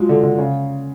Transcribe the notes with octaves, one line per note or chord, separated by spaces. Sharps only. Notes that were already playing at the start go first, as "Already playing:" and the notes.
Already playing: F3 F#3 G#3
D3
D3
C#3